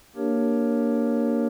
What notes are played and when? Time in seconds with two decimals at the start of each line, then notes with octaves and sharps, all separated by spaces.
0.15 A#3 D4 G4 A#4 C#5